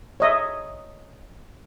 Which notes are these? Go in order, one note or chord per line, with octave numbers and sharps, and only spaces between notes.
C#5 D#5 E5